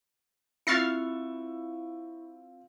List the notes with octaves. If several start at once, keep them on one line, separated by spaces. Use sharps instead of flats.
C4 E4 F4 C#6 E6 F6 A6 C7